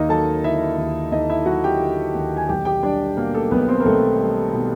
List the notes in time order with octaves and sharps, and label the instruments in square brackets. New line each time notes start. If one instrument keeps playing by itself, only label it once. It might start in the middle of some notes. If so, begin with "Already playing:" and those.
Already playing: [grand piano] D#2 A#3 D#4 A#4 D#5
F#3 A4 A5
D3 E4 E5
D#2
D#2 D#4 D#5
E4 E5
F#3 F#4 F#5
G4 G5
D3
D#2
G#5
B1 G4 G5
G4 G5
G3 D4 D5
B2 A#3 A#4
A3 A4
B1 B3 B4
C4 C5
A#4
B1 A3 A4
G3
B2